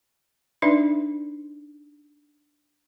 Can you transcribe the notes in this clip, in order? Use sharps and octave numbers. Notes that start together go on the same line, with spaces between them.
D4 D#4 B4 D5 E5